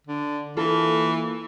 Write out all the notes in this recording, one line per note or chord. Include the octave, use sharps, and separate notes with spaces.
D3
E3 A#3 F4 A4